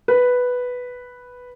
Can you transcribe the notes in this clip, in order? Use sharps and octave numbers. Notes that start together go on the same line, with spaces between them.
B4